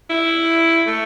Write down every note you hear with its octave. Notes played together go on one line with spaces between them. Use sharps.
E4
A3